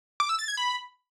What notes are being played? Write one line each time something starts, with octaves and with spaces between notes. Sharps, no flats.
D6
E6
A6
G#6
B5